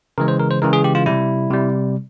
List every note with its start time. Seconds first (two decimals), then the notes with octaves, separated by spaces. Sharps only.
0.18 C#3 E3 G#3 A#4
0.28 C5
0.39 A#4
0.51 C5
0.62 C#3 E3 G#3 A#4
0.73 G#4
0.84 G4
0.95 F4
1.06 C3 G3 E4
1.50 C3 G3